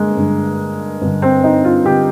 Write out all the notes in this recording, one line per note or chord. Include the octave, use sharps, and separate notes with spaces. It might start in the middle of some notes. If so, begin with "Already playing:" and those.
Already playing: G2 D3 G#3 A#3
G2 D3
G2 D3
C4
D#4
F4
D3 G4